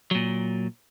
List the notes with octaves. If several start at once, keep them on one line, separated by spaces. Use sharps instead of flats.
A#2 F#3